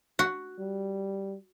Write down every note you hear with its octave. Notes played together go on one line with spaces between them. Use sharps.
F#4
G3